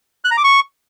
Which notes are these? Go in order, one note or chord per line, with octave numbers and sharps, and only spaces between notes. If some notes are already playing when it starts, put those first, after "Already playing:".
F#6
A#5
D6
C#6